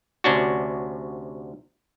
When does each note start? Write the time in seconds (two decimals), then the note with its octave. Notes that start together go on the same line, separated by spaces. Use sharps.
0.24 D2 C3 C#4 D4 F#4